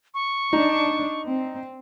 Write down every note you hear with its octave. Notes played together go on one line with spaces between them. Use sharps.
C#6
D4 D#4
C4